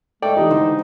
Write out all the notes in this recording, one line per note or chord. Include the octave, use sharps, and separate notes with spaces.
G#2 A3 A4 D5 G5
E3 D#4 E4 G4
D3 C5